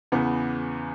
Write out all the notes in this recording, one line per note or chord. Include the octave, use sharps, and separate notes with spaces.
E2 C#3 E3 B3